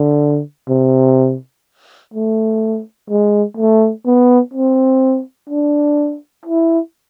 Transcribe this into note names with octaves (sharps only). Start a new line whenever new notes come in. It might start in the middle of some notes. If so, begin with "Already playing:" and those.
Already playing: D3
C3
A3
G#3
A3
B3
C4
D4
E4